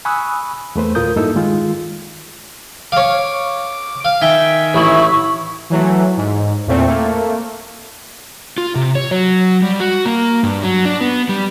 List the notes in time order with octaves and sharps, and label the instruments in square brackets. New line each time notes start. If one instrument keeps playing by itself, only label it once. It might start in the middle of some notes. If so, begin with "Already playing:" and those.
[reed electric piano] G#5 B5 C#6 D#6 E6 F#6
E2 A3 B4 C5
D2 A2 F4 A#4 D#6 G6
G2 A#3 D#4 E4 A4 E6
D#3 G#3 F4
[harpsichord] C#5 F5 [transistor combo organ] D6
[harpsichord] F5
[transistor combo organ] D#3 G#5 [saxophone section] E5 [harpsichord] G5
[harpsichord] A1 [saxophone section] E4 [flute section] C#6
[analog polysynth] E3 F#3 A3
G#2
E2 A#2 A3 C4
A3 A#3
[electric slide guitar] F4
C3
C#5
F#3
G3
F#4
A#3
G2
F#3
D4
B3
G3